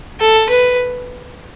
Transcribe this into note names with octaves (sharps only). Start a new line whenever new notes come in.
A4
B4